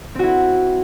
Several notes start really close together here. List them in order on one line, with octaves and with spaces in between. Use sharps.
C4 F#4 E4